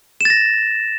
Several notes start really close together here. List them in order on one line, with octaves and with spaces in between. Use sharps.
E7 A6 A#6